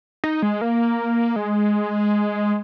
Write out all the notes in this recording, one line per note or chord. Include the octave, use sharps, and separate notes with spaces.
D#4
G#3
A#3
G#3